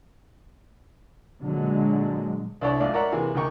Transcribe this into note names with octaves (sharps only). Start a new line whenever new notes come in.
A#2 D3 F#3 G#3
C2 D4 E4 A4 C#5 D5
A#1 G#2 A3 D5 F5
A#4 C#5 D5 E5 F#5 A#5
C3 E3 A#3 G#4
D2 D#3 A#4 G5 C#6